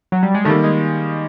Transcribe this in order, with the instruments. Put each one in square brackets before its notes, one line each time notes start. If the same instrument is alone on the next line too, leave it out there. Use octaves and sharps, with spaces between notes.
[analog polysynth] F#3
G3
G#3
[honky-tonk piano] D#3 G3 A#3 [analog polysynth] A3
[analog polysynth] G#3